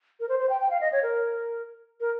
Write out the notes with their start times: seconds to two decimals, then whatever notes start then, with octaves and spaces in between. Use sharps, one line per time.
0.20 A#4
0.29 C5
0.39 C5
0.50 G5
0.61 G5
0.71 F5
0.81 D#5
0.92 C#5
1.03 A#4
2.01 A#4